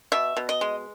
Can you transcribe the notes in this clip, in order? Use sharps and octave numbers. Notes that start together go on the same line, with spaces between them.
B2 E5
B2
D#5
G#3